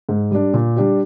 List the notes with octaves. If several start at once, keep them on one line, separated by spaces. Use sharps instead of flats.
G#2
G3 D4
A#2
G3 D4 G4